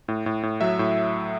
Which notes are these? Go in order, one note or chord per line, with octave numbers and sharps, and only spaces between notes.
A2
A2
A2
F#3 E5
A2